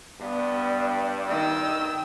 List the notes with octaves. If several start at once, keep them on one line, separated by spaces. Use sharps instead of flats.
G2 B3 D5
D#3 G5 E6